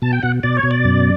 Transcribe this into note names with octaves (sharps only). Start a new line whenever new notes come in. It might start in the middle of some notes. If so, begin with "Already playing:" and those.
B2 A5
G5
B2 F#5
B2 D5
C#5
B2
D5
F#2